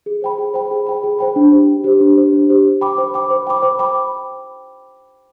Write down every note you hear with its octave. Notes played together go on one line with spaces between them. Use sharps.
G#4
C5 G5 B5
G#4
C5 G5 B5
G#4
C5 G5 B5
G#4
C5 G5 B5
D4
G4 C5
D4
G4 C5
D4
G4 C5
D4
G4 C5
C5
G5 B5 D6
C5
G5 B5 D6
C5
G5 B5 D6
C5
G5 B5 D6